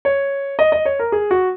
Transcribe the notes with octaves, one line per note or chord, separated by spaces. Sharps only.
C#5
D#5
D#5
C#5
A#4
G#4
F#4